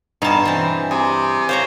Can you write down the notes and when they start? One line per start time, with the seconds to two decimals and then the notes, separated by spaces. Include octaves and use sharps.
0.22 G2 B2 D#4 G#4 A5 A#5
0.45 E3 C4
0.91 C3 G#4
1.49 C5 C#5 F5 A#5